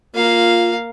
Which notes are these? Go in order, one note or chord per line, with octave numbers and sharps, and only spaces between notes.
A#3 F4 F5